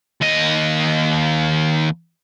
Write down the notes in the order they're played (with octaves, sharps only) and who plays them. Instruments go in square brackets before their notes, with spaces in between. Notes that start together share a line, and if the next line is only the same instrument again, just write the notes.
[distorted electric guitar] D#2 D#5